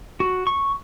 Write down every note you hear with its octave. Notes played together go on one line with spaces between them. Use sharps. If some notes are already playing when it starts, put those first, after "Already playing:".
F#4
C#6